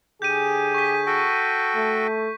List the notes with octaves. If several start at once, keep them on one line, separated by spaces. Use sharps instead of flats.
D3 G4 G#4 G6 D#7
C#6 B6
F#4 A4 G5
A3